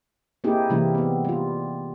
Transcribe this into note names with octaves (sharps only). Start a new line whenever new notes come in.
A#3 C4 D#4 E4 G4 G#4
C3 E3 G3 A#3 C4 E4
B3 C4
G3 F4